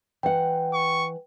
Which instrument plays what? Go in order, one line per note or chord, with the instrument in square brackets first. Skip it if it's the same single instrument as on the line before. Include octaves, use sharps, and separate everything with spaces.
[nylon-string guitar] E3 F#5 [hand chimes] G5
[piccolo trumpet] C#6